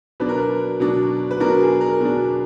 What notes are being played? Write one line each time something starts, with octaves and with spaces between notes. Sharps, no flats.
B2 F#3 D4 B4
A#4
B4
B2 F#3 D4
B4
B2 F#3 D4 A#4
G#4
A#4
B2 F#3 D4